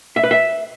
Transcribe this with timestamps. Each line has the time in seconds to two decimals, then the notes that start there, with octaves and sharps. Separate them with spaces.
0.16 E5
0.24 B4
0.31 E5